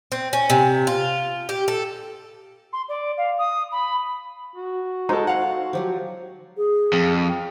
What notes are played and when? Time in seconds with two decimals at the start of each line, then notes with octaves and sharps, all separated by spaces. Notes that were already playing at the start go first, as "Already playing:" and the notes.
0.12 C4
0.33 C#4
0.50 C3
0.87 F4
1.49 G4
1.68 A4
2.73 C6
2.88 D5
3.17 F5
3.38 D#6
3.72 B5
4.55 F#4
5.09 G#3 D#4 A4 C5 C#5
5.27 F5 F#5
5.73 F3 F#3 F4 G4
6.57 G#4
6.93 F2